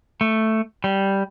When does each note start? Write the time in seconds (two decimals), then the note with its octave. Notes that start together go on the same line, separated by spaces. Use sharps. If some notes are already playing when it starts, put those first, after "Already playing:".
0.21 A3
0.84 G3